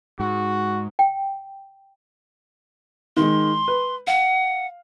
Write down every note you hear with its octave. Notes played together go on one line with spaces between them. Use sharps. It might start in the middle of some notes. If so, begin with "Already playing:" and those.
G#2 F#4
G5
D#3 G#3 C6
B4
F5 F#5